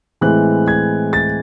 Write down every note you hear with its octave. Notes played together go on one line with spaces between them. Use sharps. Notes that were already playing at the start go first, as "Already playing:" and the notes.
A2 E3 G#3 C4 F#6
G#6
A6